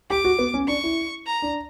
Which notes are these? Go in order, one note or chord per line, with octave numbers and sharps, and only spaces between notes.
G4 D6
F#4
B3
C#4
D4 C#6
E4
A#5
D4